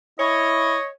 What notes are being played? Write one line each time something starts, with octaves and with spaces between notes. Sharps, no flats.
E4 C#5 D#5